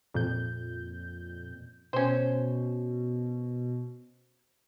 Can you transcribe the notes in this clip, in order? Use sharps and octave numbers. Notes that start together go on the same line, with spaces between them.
F2 A#2 G6
B2 C#4 C5